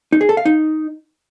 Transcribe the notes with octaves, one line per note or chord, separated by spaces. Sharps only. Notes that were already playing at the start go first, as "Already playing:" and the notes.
D#4
G#4
A4
F5
D#4